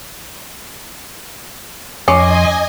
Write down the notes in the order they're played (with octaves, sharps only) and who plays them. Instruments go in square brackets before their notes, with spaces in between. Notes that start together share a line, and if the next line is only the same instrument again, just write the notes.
[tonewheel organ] F2 C6 [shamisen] C#4 [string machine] D#5 G#5 [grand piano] D6